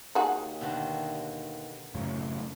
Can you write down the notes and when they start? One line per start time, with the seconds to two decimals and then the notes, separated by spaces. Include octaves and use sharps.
0.15 D#2 D#4 F#4 G#4
0.61 B2 D3 D#3
1.95 F#2 A2 C#3